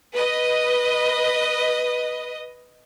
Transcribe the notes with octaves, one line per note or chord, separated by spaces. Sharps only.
B4 D#5